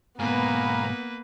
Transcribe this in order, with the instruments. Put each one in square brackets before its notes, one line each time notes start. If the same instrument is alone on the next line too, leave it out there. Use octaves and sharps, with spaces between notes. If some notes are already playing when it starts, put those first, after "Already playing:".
[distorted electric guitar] G#2 B2 [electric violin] A#3 B4 [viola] B3 [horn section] F5 G#5 A#5